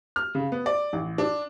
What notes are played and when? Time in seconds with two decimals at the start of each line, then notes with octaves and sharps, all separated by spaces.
0.16 F6
0.35 C#3
0.52 B3
0.66 D5
0.93 A1
1.18 D4